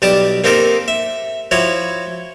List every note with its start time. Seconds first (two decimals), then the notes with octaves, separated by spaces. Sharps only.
0.02 B1 G3 G4 A5 D6 D#6
0.44 A#3 C4 D#4 G4 A4 A#4
0.88 E5
1.51 F3 E4 F#4 C#5